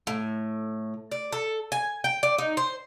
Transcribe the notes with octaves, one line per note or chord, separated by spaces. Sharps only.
A2
D5
A4
G#5
G5
D5
D#4
C5